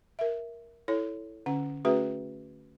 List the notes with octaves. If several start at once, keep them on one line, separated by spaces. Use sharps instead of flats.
A#4 E5
E4 A4 C#5
D3 C#4 F#5
A3 C#4 F#4 G#4 B4 E5